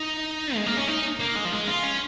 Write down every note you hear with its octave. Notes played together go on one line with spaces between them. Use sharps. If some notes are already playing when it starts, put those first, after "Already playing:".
Already playing: D#4
G#3
A#3
C#4
D#4
A#3
G#3
F3
G#3
F4
C#4